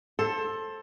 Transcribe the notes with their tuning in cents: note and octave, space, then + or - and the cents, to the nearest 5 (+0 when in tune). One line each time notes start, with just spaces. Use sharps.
A4 +5 C5 +25